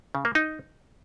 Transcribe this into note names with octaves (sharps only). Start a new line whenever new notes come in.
C#3
A#3
D#4